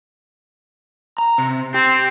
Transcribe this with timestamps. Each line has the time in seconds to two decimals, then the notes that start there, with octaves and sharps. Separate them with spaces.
1.18 A#5
1.38 C3
1.74 C4 G4